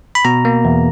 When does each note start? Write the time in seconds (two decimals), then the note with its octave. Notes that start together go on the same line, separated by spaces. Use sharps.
0.15 B5
0.25 B2 A#5
0.45 A#3
0.65 E2